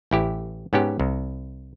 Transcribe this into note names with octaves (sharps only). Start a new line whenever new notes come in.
A1 E4 G4
G#2 B3 C#4 G4
C2